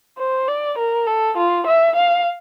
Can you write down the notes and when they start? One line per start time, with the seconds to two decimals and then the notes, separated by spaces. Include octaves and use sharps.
0.18 C5
0.48 D5
0.78 A#4
1.07 A4
1.37 F4
1.66 E5
1.96 F5